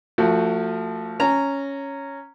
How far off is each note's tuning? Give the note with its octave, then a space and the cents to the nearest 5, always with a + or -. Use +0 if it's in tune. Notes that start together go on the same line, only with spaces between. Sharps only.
F3 +0 A3 +30 F#4 +0
C#4 +0 A#5 -10